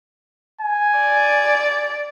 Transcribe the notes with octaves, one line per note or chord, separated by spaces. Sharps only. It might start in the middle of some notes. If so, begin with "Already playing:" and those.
G#5
D5